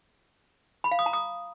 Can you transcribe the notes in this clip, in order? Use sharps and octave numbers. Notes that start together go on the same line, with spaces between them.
B5
F5
D#6
A#5
D#6